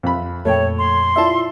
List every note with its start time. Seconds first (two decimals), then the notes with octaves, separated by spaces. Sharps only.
0.03 F2 B5
0.45 F2 A#2 A3 C#5 G5
0.79 C6
1.16 E4 F4 D5 E5 A5